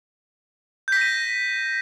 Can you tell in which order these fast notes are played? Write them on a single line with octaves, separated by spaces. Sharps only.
G6 B6 A#6 D#7